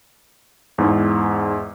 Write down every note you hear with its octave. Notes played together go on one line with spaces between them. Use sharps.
E2 G#2